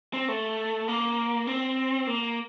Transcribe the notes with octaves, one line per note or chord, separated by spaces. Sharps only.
C4
A3
A#3
C4
A#3